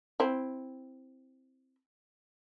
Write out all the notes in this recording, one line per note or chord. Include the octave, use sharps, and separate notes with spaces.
C4 E4